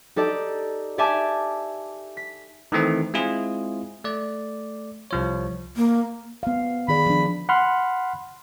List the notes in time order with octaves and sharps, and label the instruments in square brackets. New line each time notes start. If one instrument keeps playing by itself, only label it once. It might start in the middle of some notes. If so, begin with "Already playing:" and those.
[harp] D#4 G4 A4 D5
G4 D5 E5 G#5 A5 D6
B6
[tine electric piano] D#3 E3 A3 C4
G#3 C4 E4 F4 G#4
A3 D5
C2 F3 C#5
[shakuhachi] A#3
[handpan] B3 F5
[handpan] D#3 G#4 D5 [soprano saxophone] B5
[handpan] F3 D4
[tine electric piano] F#5 B5 C6 F6